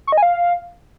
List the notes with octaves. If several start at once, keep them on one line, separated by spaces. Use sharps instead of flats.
C#6
D#5
G#5
F5